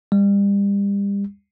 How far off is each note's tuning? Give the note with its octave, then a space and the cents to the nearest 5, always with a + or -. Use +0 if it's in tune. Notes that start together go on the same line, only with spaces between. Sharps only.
G3 +35